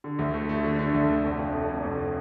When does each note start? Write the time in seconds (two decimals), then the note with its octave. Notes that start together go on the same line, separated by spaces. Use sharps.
0.04 D3
0.19 D2
0.34 A3
0.49 A3
0.64 D3
0.79 D3
0.94 D2
1.09 D2
1.24 F1
1.39 F2
1.54 F1
1.69 F1
1.83 F1